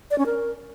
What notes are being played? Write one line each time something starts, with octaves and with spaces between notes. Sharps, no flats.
D5
C#4
A#4